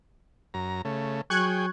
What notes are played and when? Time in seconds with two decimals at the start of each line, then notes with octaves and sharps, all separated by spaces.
0.54 F#2 A#5
0.85 C#3 A3
1.30 F#3 G#4 G5 C#6 F#6 G#6